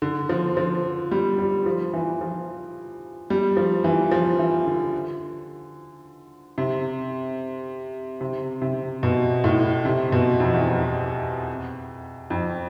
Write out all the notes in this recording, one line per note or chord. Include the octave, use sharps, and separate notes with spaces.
D3
F3
F3
G3
G3
F3
E3
F3
G3
F3
E3
F3
E3
D3
C3
C3
C3
B2
A2
C3
B2
F2
E2
F2
F2